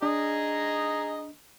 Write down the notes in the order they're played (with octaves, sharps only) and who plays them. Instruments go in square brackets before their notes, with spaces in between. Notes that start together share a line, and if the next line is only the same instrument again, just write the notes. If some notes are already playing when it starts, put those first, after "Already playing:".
[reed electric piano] D4 [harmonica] G#4 D#5 A#5